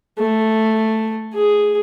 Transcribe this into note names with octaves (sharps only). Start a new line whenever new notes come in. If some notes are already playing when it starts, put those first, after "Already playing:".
A3
G#4